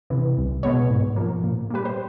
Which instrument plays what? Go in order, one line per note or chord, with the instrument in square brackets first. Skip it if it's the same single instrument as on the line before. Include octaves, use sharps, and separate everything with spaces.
[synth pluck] C3 E3
C2
B2 G#3 B3 C#5
G#2
F3 A#3
A#2
G3 A#3 B4
C5